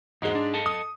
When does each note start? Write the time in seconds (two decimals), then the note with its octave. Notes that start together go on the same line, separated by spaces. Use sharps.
0.22 E2 G#2 G#3 F#4 C5
0.35 D4
0.54 A4 D#5 A5
0.66 D#6